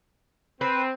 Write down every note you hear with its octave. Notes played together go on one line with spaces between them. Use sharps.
C4 B4